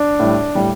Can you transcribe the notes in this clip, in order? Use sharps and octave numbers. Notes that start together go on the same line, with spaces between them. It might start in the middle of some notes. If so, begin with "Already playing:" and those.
Already playing: D4
A2 G3
A2 G3